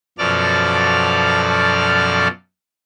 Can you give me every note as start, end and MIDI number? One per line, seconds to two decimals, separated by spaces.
0.18 2.28 42
0.18 2.28 47
0.18 2.28 53
0.18 2.28 69
0.18 2.28 74
0.18 2.28 89